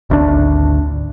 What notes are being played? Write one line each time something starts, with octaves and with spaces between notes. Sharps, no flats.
G#1 D2 B2 D4